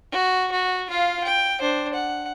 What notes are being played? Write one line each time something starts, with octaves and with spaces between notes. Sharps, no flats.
F#4
F#4
F4 F5
G5
D4 C5
F#5